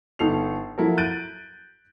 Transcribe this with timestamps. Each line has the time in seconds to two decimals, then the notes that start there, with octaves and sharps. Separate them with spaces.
0.19 G1 D#4 A4 C7 F7
0.78 F3 F#3 E4 A4 A#4
0.97 F#6 G6 A6 D7 D#7